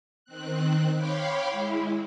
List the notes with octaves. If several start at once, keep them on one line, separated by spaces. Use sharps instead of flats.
D#3 C4 F#6
C#5 F5 G5 B5 C6 D6
G#3 E4